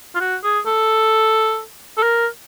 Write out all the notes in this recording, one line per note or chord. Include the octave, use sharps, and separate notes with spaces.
F4
F#4
G#4
A4
A4
A#4